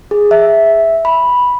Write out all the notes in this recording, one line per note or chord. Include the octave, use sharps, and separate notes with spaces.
G#4
E5
B5